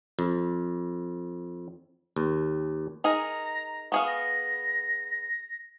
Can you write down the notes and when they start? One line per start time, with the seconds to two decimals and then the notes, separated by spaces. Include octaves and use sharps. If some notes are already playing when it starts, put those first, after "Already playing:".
0.19 F2
2.16 D#2
3.04 D#4 G#4 A#4 A#5
3.92 B3 G#4 F5 C#6
4.07 A#6